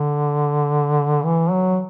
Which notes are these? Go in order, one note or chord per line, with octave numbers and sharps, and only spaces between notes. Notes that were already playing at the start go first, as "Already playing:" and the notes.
Already playing: D3
E3
F#3